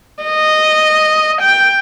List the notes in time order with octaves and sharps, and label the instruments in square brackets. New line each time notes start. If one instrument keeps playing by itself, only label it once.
[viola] D#5
G5